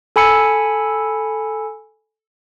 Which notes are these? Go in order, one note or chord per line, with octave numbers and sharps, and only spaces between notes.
A4 G#5 B5 E6 C#7